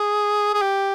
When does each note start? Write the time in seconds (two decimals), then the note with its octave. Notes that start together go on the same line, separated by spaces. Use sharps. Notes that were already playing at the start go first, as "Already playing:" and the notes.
Already playing: G#4
0.54 G#4
0.61 G4